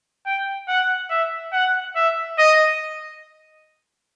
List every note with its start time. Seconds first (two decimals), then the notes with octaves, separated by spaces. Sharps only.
0.26 G5
0.68 F#5
1.10 E5
1.52 F#5
1.95 E5
2.38 D#5